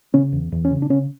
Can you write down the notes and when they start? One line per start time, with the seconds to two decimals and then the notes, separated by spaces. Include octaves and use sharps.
0.14 C#3 C#4
0.32 E2
0.52 E2
0.65 C#4
0.71 C#3
0.82 D4
0.90 C#3 C#4